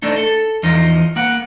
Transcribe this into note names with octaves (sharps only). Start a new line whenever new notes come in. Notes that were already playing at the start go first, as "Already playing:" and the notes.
A3 D4 D#4
A4
E2 F3 D#4
A#3 F#5